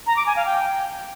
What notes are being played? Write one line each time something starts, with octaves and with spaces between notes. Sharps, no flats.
A#5
D6
G#5
F5
G5